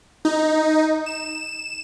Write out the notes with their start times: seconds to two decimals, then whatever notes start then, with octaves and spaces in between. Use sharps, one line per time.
0.25 D#4
1.06 E7